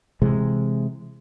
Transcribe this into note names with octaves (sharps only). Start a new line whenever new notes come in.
C3 E3 G#3